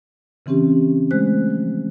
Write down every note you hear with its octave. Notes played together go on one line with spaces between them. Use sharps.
C#3 E3 C4 C#4 G4
G#3 A3 C5 F#6
F3